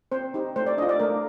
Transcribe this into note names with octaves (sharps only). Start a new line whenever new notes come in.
C4 C5
D#4 G4
A3 C5
D5
D4 F4 D#5
D5
A3 A#4